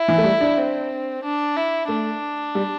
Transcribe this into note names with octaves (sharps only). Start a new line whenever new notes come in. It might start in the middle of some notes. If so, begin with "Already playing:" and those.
Already playing: E4
E3
A3
G3
D4
C4
D4
E4
A3 D4
G3